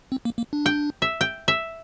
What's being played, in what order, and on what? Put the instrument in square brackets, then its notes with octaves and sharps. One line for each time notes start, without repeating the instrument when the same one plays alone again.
[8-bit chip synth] C4
A#3
A#3
D4
[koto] G5
E5
G5
E5